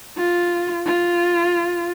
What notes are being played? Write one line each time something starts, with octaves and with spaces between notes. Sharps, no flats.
F4
F4